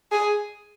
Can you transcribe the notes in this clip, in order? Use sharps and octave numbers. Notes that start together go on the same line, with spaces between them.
G#4